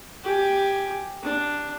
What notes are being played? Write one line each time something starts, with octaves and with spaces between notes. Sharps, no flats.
G4 G#5
D4